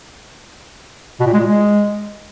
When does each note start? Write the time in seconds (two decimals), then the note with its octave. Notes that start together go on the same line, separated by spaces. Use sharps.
1.20 B2
1.27 A#2
1.33 G#3
1.40 A#2
1.47 G#3